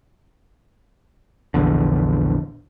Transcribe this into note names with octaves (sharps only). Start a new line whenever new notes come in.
A#1 E2 D3